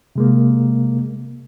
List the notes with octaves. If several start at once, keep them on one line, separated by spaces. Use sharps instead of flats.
C3 G#3 A#3